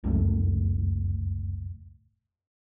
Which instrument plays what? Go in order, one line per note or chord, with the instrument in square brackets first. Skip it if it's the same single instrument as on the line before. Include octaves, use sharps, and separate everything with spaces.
[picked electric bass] F1 C#2 F#2 A2